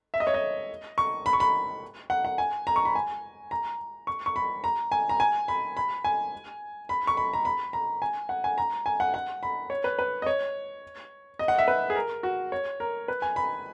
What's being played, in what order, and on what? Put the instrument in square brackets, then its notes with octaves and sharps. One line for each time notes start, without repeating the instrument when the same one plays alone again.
[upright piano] E5
D#5
C#5
D#5
C#6
B5
C#6
B5
F#5
F#5
G#5
A#5
C#6
B5
G#5
A#5
C#6
C#6
B5
A#5
G#5
A#5
G#5
B5
B5
G#5
B5
C#6
B5
A#5
B5
A#5
G#5
F#5
G#5
A#5
G#5
F#5
F#5
B5
C#5
B4
B4
D#5
C#5
D#5
F#5
E5
B4
G#4
A#4
F#4
C#5
A#4
B4
G#5
B5